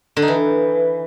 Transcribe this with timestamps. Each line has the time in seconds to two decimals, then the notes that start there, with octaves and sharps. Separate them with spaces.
0.17 D3
0.22 D#4
0.28 E3